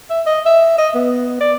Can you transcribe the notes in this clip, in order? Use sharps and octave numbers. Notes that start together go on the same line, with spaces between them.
E5
D#5
E5
D#5
B3
D5